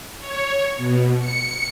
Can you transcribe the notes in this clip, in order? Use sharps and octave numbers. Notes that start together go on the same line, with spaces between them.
C#5
B2
C#7